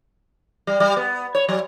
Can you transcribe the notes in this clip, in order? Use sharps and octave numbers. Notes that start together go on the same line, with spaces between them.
G3
G3
B3
C#5
F#3